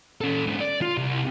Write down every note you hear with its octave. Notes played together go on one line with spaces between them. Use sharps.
C#4 A4
G#2 D3
D5
F4
C2